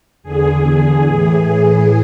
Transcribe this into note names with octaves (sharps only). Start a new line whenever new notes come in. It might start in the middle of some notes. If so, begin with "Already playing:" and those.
E2 D3 G#4
G#4
A2 E3